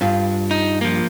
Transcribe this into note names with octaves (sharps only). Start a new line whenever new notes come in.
G2 F4
D#4
F3 A#3